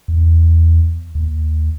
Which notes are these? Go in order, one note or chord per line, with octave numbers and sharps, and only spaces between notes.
E2
D#2